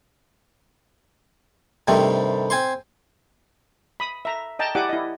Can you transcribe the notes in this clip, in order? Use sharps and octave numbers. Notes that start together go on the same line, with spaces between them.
G2 C3 D#3 G3 A3 C4
C4 G#5 A5 C6
B5 D#6
E5 A#5
D#5 G5 A5 A#5
E4 G4 D5 F#5 G#5 D6
E4 D#5